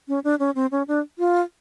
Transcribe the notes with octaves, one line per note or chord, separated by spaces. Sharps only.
C#4
D4
C#4
C4
C#4
D4
F4